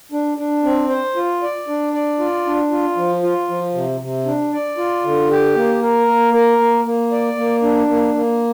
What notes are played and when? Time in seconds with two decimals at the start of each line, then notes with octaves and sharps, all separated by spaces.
0.12 D4
0.38 D4
0.64 C4
0.89 C5
1.16 F4
1.42 D5
1.68 D4
1.93 D5
2.19 F4
2.46 D4
2.71 F4
2.96 F3
3.23 F4
3.48 F3
3.74 C3
4.00 C3
4.26 D4
4.53 D5
4.77 F4
5.04 D3
5.30 G4
5.55 A#3
5.82 A#4
6.07 A#3
6.34 A#4
6.59 A#3
6.85 A#3
7.12 D5
7.37 A#3
7.62 D4
7.89 A#3
8.14 A#3